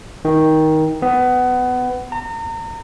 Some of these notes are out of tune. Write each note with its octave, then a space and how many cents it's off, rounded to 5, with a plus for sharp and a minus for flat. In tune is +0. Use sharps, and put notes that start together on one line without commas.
D#3 +15
B3 +20
A#5 -35